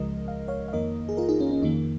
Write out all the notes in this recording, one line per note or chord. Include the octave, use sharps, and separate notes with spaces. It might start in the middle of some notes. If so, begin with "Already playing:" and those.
Already playing: C#2 C#3 F3 G#3 A#4 D#5
F5
C#5 F5
F5
F2 D#3 A#3 A#4 D#5
G#4
F4 A#4
D#4 G#4
C#4
C#4
F2 D#3 A#3 D#4